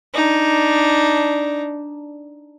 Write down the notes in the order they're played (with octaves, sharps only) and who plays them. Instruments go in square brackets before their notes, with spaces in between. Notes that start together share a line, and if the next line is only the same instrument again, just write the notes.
[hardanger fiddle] D4 D#4